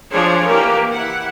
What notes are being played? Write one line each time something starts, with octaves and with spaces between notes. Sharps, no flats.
F3 D4 G#4 C5 C#5
E3 A#3 G4 A#4
E4 F#5